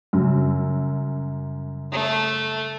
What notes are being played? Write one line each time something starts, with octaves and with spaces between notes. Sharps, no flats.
F#2 C#3 G3
A3